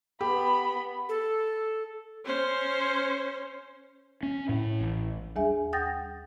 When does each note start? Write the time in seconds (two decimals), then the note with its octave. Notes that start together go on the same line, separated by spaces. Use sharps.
0.21 B3 G4 B5
1.09 A4
2.26 C#4 C5
4.23 C#4
4.49 A2
4.81 A1
5.36 D#2 G3 D4 G#4 E5 G#5
5.73 F#5 G5 D#6 G6 A6 A#6